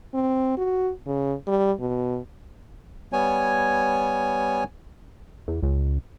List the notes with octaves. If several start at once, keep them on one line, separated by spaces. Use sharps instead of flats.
C4
F#4
C#3
G3
B2
G3 B3 C#5 G#5
E2
C#2